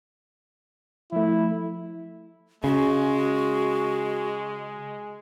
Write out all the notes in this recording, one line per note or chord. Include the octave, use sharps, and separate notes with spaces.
F3 A3 E4
C#3 G#3 F#4